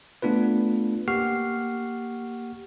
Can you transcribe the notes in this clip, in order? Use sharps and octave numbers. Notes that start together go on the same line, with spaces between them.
A3 B3 D4 F4 B4
A#3 G4 F#5 C#6 F6 C7